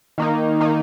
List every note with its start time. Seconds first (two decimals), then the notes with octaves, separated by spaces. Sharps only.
0.18 D#3 A#3 D#4
0.60 D#3 A#3 D#4